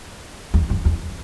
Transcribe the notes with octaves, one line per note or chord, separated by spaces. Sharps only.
E2
F#2
E2